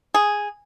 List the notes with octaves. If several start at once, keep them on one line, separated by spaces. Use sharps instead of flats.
G#4